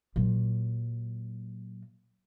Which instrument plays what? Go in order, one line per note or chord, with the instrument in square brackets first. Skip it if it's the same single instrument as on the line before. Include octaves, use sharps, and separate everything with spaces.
[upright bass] A#2 F#3